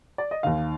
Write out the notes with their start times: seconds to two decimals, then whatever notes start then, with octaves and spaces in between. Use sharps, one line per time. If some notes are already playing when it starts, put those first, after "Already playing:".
0.18 D5
0.31 D#5
0.43 D#2 D#3 F5